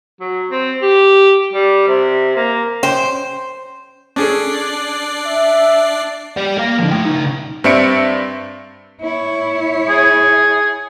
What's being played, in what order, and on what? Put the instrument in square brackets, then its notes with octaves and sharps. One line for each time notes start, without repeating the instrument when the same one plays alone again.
[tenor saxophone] F#3
C4
G4
G3
C3
A#3
[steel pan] C#4 G5 [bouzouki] C5
[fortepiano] C#4 G#4 A4 [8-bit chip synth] D4 D5 C7
[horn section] E5
[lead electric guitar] G4 D5
A#4 F5
D3 F3
A3 G5
C#3 D#4
[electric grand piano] G2 C4 D5 E5 C#7 D7
[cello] E4 C#5
[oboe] G#4